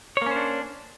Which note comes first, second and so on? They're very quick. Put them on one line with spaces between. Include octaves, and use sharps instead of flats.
C#5 A#3 C#4 C5 D4